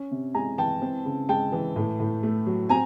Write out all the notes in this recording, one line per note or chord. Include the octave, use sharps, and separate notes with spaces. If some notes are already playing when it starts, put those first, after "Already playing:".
Already playing: C#4
C3
G#3 G#5 A#5
E3 G5 A5
C4
C#3
G#3 G5 A5
E3
A2
A2
A3
F#3
C4 G#5 A#5